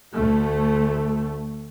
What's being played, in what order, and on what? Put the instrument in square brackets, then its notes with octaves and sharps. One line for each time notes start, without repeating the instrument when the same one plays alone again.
[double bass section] D2 A3